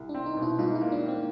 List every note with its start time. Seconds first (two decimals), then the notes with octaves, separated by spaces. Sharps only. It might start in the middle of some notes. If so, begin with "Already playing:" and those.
Already playing: C2
0.09 D4
0.14 C4
0.26 D#4
0.37 B2
0.42 E4
0.59 G#2 F4
0.75 E4
0.81 A#3
0.92 D4
1.03 D#3
1.08 C4